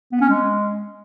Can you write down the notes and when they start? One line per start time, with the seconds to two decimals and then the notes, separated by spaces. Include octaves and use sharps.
0.12 B3
0.21 C#4
0.29 G#3